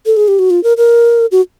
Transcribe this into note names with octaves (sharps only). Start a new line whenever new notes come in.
A4
G#4
G4
F#4
F4
A#4
A#4
F#4